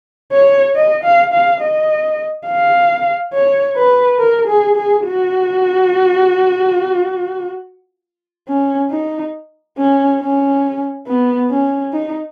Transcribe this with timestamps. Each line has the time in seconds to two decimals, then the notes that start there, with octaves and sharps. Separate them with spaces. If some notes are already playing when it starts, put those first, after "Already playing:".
0.32 C#5
0.76 D#5
1.04 F5
1.33 F5
1.61 D#5
2.47 F5
3.34 C#5
3.77 B4
4.19 A#4
4.48 G#4
4.76 G#4
5.06 F#4
8.48 C#4
8.91 D#4
9.78 C#4
10.21 C#4
11.07 B3
11.50 C#4
11.93 D#4